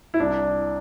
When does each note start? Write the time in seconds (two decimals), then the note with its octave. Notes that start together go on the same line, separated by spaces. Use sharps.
0.14 E4
0.20 C2 D4